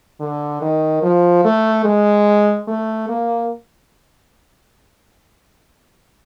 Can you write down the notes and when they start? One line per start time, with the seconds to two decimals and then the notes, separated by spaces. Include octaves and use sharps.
0.20 D3
0.61 D#3
1.03 F3
1.45 A3
1.85 G#3
2.68 A3
3.09 A#3